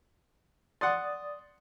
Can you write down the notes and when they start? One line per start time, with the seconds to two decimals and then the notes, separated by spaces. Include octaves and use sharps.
0.81 D5 F#5 C6 D#6 A6